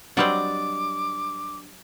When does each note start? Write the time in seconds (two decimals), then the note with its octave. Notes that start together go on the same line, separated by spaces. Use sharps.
0.17 F#3 G3 C4 D4 D5 D#5 D6